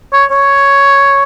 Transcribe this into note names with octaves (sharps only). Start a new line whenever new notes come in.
C#5
C#5